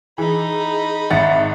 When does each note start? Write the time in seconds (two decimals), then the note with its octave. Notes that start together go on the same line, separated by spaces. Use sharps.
0.18 E3 D#4 G#4 B5
1.10 G#1 E5 F#5 A6